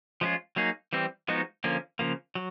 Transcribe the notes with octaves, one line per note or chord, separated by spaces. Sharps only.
F3 G#3 C#4 F4
F#3 A#3 D#4 G#4
E3 G3 C4
F3 G#3 B3 D#4 F#4
D3 F3 A#3 C#4
C#3 F3 A#3
F#3